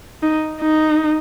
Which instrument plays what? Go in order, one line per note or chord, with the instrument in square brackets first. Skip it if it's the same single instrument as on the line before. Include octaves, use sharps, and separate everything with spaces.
[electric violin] D#4
D#4